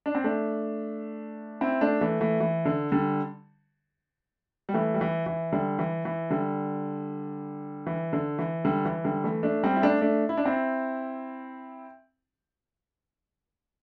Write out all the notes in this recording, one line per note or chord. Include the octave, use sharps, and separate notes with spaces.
D4
C4
A3 D4
C4 E4
A3 D4
E3 A3
E3 A3
E3
D3
D3 G3
G3
E3 A3
G3
E3
E3
D3 G3
E3
E3
D3 G3
E3
D3
E3
D3 G3
E3
D3 G3
E3 A3
A3 D4
G3 C4
E4
A3 D4
A3 D4
E4
D4
C4 E4